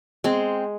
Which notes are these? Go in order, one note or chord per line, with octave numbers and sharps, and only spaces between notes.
G#3 C4